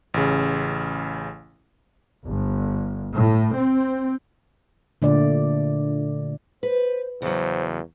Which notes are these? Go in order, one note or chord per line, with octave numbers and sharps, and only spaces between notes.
A1 C#3
G1
A2
C4
A#2 D3 A3 D5
B4 C5
E2 C#3 F#3 C5